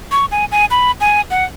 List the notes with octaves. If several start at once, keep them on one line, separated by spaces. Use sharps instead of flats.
C#6
G#5
G#5
B5
G#5
F#5